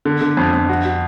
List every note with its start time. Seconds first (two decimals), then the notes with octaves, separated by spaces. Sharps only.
0.05 D3
0.21 D3
0.37 F2
0.53 F2
0.69 F#4
0.85 F#4